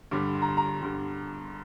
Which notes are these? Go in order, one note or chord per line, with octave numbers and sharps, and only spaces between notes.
G2 D3 G3 D6
C6
A#5
C6
A#5
G2 D3 G3